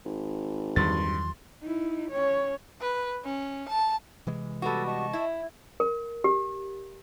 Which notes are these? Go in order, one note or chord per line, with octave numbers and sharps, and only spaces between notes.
G#1
E2 G2 D#3 F#3 C6 A6
D#4 E4
C#4 C#5
B4
C#4
A5
C3 E3 G#3
G3 B3 F#4 A4
D#5 A5 C#6
E4
A#4
G4